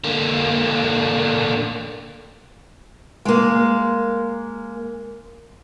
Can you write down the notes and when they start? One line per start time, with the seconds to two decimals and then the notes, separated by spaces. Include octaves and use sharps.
0.04 D3 A#3
3.25 G#3 A#3